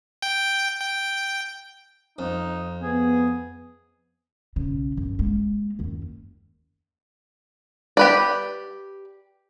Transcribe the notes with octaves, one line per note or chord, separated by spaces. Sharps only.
G5
G5
F2 D#4
B3 G#4
B1 C#3
F#2
G#3 A#3
F#1 D#2
G4 B4 D5